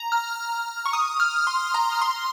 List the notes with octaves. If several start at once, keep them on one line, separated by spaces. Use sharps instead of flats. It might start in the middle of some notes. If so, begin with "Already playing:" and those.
Already playing: A#5
F6
C#6
D#6
F6
C6
A#5
C6